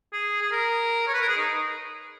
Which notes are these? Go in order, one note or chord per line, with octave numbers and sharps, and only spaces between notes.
G#4
G#4
A#4
C#5
B4
A#4
G#4
D#4